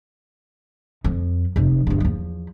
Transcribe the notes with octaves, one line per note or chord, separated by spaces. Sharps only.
F2
F1 F2
G1 E2
E2 F3